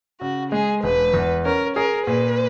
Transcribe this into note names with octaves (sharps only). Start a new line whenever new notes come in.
C#3 F#4
G#3 G#4
E1 B4
E2
C#4 A#4
G#4 A#4
A#2 B4